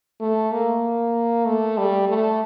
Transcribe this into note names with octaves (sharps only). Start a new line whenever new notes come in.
A3
A#3
A3
G3
A3